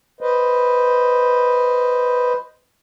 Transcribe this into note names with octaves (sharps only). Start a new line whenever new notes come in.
B4 C5 D#5